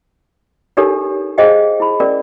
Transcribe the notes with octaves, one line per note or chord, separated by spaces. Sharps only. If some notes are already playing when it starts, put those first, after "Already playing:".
D4 D#4 G4 A4 A#4 C#5
G#4 C5 D#5 F5 G5
E4 B5
C#4 A#4 D5